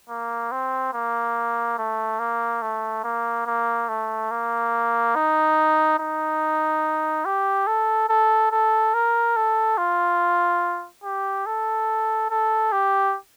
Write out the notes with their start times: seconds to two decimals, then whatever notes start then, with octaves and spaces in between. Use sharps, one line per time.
0.09 A#3
0.52 C4
0.94 A#3
1.78 A3
2.20 A#3
2.62 A3
3.04 A#3
3.47 A#3
3.89 A3
4.31 A#3
5.15 D#4
5.99 D#4
7.25 G4
7.67 A4
8.09 A4
8.52 A4
8.94 A#4
9.37 A4
9.78 F4
11.04 G4
11.46 A4
12.31 A4
12.72 G4